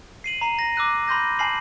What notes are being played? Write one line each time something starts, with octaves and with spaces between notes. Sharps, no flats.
C7 D#7 F#7
A#5 C7 D#7
A#6
D6 E6 F#6 D#7
B5 C6 G6 A#6
G#5 A5 B5 F6 C7 F#7